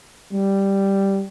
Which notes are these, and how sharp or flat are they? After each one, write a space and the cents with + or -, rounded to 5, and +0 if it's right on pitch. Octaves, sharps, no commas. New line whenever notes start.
G3 +0